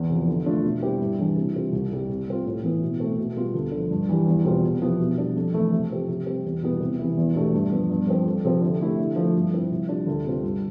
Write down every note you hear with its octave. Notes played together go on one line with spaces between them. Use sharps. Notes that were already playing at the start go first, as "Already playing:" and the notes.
Already playing: E2
C3 F3
D3
A3 D4 F4
B2
G3 C4 E4 G4
G2
E3 G3 D4
C3
G3 C4 F4
C2
C3 G3
C3
G3 C4 F4
A2
E3 B3 E4
B2
A3 C4
B2
G3 B3 F4
D2
D3 F3
G2
E3 G3
E2
B2 G3 C4 F4
C3
F3 B3 E4 G4
B2
G3 D4
F2
E3 A3 E4
C3
F3 C4 G4
C3
G3 C4 G4
E2
B2 G3 B3 E4
C3
E3 B3 E4
E2
B2 A3 D4 G4
G2
F3 B3
G2
F3 C4
F2
C3 F3 C4
D3
A3 E4 G4
D3
F3 A3
G2
F3 C4 E4
C3
G3 D4 F4
D2
C3 G3 C4 F4
G2